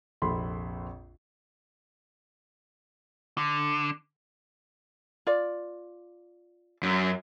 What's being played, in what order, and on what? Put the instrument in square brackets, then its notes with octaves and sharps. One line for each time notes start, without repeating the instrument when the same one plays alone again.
[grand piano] A#1 F2 C3 A4 B5 C6
[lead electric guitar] D3
[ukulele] F4 D5
[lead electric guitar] F#2